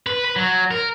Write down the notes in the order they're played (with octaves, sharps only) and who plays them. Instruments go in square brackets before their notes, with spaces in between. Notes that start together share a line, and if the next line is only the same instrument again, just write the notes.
[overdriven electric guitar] B4
B4
F#3
A#4